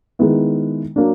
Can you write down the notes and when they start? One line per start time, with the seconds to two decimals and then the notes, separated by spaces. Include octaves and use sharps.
0.19 D#3 G#3 B3 E4
0.96 F#3 A#3 D4